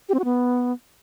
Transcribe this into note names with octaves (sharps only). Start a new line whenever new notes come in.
G4
C4
F#4
B3